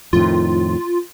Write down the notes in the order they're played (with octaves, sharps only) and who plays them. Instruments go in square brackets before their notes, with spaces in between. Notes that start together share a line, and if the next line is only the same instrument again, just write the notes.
[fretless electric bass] F2 A2 D#3 [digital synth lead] F4